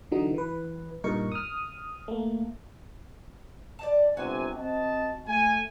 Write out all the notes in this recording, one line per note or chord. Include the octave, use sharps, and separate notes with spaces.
D3 E3 F#3 D#4
E3 B4
G2 A#2 D#4 A#4 C#6
D#6 F6
A3 A#3
D5 D#5 A5
G1 C3 F#4 G#5
C4 D#5 A5
A3 G#5